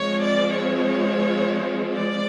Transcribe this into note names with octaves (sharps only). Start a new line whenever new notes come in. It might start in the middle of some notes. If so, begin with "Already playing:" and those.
Already playing: F3 G#3 C4 C#5
D5
C#5
D5